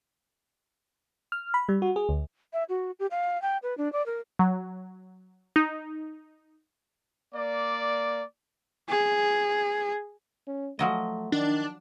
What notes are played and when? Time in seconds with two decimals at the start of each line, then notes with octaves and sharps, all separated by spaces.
1.32 F6
1.54 B5
1.69 G3
1.82 F#4
1.96 G#4
2.09 D2
2.53 E5
2.69 F#4
2.99 G4
3.11 F5
3.42 G5
3.63 B4
3.78 D4
3.93 D5
4.06 A#4
4.39 F#3
5.56 D#4
7.34 A#3 D5
8.89 G#4
10.47 C#4
10.79 F3 F#3 A3 D#5
11.32 D#3 D4